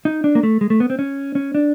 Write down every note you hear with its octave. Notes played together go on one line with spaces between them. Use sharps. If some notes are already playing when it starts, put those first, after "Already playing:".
D#4
D4
A#3
A3
G#3
A3
B3
C4
C#4
C#4
D4